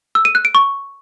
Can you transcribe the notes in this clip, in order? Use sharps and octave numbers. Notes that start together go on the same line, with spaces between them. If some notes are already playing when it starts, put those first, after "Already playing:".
E6
D#7
F#6
D7
C#6